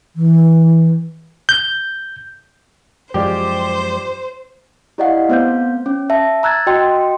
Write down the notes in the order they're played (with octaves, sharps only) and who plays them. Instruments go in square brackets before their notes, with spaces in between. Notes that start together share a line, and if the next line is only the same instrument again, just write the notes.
[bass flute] E3
[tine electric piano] G6
[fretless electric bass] F#2 F3 G#3 [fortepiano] G4 D5 [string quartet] C5
[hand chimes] E4 G4 D5 D#5 F5 F#5
A3 B3 C4 C5 F5 G6
C#4
E5 A5
A#5 E6 F#6 G#6 A6
F#4 D#5 G5 C6